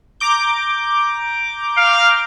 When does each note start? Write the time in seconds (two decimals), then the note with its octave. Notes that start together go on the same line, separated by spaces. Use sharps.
0.20 A#5 D6 G6
1.77 F5